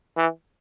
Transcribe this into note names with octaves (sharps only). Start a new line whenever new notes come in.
E3